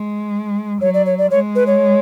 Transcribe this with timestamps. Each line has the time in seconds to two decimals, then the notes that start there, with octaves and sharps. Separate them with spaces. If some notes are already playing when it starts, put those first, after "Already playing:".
Already playing: G#3
0.81 F#3 C#5
0.94 D5
1.06 C#5
1.18 D5
1.31 G#3 C#5
1.55 B4
1.67 C#5